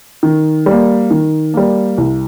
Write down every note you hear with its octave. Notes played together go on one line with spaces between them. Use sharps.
D#3
G3 A#3
D#3
G3 A#3
C2